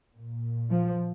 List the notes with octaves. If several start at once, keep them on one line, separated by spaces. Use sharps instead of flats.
A#2
F3